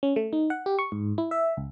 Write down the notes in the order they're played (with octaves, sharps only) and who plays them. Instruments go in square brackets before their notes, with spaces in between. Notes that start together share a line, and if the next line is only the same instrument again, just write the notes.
[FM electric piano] C#4
A3
D#4
F#5
G4
C#6
G#2
E4
E5
C#2